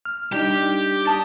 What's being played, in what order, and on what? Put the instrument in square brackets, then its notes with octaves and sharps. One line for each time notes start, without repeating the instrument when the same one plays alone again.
[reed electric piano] F6
[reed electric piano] G3 D4 D#4 [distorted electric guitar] G4
[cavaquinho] D5 A5 D#6